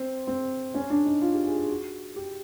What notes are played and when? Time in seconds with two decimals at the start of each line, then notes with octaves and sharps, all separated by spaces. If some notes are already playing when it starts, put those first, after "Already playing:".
Already playing: C4
0.27 C4
0.74 C#4
0.90 D4
1.05 D#4
1.22 F4
1.33 G4
1.46 G#4
1.57 G#4
1.70 F#4
2.16 G4